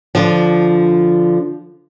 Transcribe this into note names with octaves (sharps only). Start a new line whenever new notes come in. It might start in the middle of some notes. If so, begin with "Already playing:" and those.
D3 F3